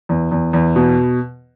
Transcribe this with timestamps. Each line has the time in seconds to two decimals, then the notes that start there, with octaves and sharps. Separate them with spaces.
0.09 E2
0.32 E2
0.53 E2
0.76 B2